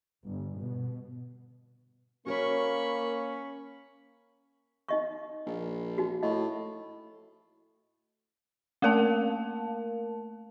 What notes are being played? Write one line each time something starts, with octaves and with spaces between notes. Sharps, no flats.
G1
B2
A#3 C#4 F#4 A#4 C#5 B5 C#6
D#4 D#5 C#6
A#1
D#4 F#4
A2 D#5
A3 A#3 A#4 F5 A5